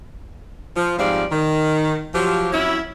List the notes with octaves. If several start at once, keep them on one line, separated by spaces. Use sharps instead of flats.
F3
F2 G#2 F3 G3 D5 F5
D#3
F3 F#3 G4
F2 F#3 C#4 E4